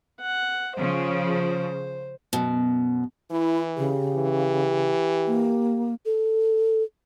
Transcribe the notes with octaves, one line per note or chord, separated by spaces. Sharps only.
F#5
C#3 F3 C5
F#2 B2
E3 E4
C#3 G4
E3
A#3
A4